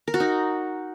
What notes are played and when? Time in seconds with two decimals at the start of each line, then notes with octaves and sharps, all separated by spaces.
0.08 A#4
0.14 F#4
0.20 D#4